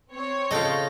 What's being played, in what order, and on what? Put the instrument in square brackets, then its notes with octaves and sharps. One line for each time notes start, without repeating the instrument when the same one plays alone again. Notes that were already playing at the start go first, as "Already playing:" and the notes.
[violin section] C4 C#5
[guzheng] C#3 A4 G5 [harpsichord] F4 D#5